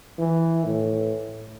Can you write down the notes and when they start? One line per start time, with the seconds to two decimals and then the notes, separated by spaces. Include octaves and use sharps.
0.18 E3
0.65 A2